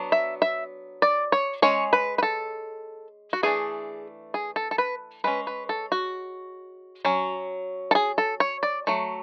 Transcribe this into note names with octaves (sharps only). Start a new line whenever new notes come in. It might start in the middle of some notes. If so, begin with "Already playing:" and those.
Already playing: F#3 B3 D4
E5
E5
D5
C#5
G#3 C#4 C#5
B4
B4
A4
F#4
E3 A3 D4 G#4
G#4
A4
A4
B4
G#3 C#4 B4
B4
A4
F#4
F#3 C#4
A4
G#4
A4
C#5
D5
F#3 A3